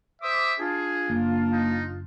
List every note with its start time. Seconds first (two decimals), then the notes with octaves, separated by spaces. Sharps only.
0.22 C5 E5 D6 D#6
0.60 D4 F4 G#4
1.09 F#1 A#3
1.53 D#4